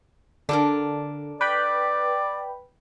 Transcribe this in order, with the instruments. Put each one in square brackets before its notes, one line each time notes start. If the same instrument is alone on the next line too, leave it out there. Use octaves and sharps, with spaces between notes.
[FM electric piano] D3 [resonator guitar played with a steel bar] D4 A4 A#4
[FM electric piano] B4 G5 B5 [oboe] D5